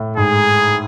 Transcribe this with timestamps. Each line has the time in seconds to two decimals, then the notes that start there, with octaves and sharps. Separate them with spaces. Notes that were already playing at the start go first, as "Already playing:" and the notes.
Already playing: A2
0.17 G#2 G#4